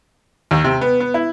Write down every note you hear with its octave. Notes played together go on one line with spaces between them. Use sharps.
D#2
C3
B3
B3
E4